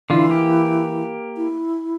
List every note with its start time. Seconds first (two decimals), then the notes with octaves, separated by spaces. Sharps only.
0.10 D3 E3 F4
0.29 A#3 G4
1.37 E4